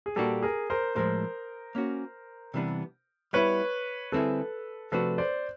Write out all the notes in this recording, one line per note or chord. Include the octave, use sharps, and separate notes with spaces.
G#4
A#2 G3 A#3 D4 F#4 G4 A4
G#4 A#4
A#4 C5
A2 F3 G#3 A#4 C5
A#3 C#4 F#4
C3 E3 G3 B3 D4
G3 B3 E4 B4 C#5
D3 G3 C4 E4 G#4 A4 B4
C3 F3 A3 D4 F#4 A4 B4
C5 D5